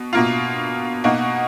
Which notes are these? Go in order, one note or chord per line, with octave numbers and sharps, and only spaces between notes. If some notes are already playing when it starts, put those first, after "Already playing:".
Already playing: B2
B2 A#3 F4
B2 A#3 D#4 F#4